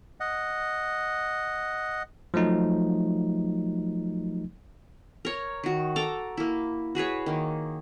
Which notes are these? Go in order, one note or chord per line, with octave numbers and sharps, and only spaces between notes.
D#5 F#5
F3 F#3 A3 D#4
A#4 C#5
D#3 F#4
A4 A#5 D6
A#3 E4
F#4 G#4 B4 C#5
D#3 A#3